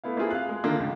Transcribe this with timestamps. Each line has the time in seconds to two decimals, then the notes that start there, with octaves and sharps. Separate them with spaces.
0.04 A3 B3 E4 F5
0.17 A3 A#3 C4 E4 F4 G#4
0.31 F5 F#6
0.49 G#3
0.64 D3 D#3 A3 A#3 D4 F4
0.80 C#2